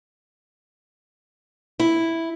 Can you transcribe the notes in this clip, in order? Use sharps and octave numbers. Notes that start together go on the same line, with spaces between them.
E4